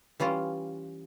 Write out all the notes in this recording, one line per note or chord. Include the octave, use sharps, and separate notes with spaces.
E3 G3 C#4 F4